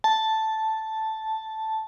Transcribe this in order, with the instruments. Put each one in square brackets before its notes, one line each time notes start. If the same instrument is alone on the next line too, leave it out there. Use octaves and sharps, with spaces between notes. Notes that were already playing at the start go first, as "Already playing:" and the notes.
[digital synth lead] A5